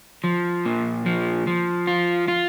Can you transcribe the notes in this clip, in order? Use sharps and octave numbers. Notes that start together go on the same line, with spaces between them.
F3
A#2
F3
F3
F4
F4